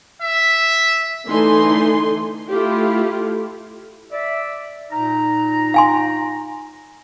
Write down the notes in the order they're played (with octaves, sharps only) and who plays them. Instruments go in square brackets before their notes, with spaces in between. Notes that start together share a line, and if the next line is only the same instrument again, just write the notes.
[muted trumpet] E5
[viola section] D3 E3 A3 D#4 G#5 C6
A3 E4 F4 G4
[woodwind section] D5 E5
A#2 D#4 A#5
[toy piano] F5 G#5 C6